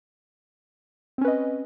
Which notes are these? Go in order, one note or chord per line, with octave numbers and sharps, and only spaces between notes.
C4 C#4 B4 D#5